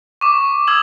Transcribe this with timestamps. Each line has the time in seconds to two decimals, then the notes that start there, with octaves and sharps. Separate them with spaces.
0.21 C#6 D6
0.67 D#6 E6 G#6 F#7